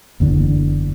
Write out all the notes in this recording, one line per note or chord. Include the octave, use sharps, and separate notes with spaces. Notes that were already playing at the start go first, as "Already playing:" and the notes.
F#1 E2 D3